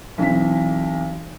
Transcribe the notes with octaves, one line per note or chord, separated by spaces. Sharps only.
B1 E3 C4 B6